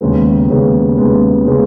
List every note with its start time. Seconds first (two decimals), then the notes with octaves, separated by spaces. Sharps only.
0.01 D#2 C#3 G#3 B3
0.49 D#2 C#3 G#3 B3
0.97 D#2 C#3 G#3 B3
1.47 C#3 G#3 B3